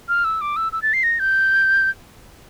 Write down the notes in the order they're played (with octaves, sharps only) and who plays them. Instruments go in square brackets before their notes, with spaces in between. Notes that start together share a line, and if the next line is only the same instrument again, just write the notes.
[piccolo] F6
E6
D6
E6
E6
A6
C7
A#6
G6